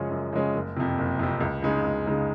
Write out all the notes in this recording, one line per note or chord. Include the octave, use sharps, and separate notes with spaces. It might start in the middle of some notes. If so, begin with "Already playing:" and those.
Already playing: F#2 C#3 F3 G#3 C#4
F#2
C#3 F3 G#3 C#4
F#1
F2 C3
F#1
F2 C3
C#2
C#3 G#3 D#4
C#2
C#3 G#3 D#4